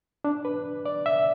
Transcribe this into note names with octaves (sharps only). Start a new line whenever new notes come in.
D4
B4
D5
E5